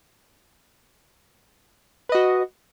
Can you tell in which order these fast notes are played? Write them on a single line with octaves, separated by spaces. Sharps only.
B4 D#5 F#4